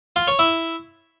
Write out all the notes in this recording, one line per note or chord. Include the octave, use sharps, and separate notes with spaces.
F4
C#5
E4